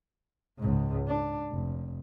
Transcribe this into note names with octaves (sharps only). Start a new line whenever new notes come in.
C#2 G#2
D4
F1